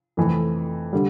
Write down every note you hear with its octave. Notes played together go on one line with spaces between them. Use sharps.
F2 E3 A3
D3 G3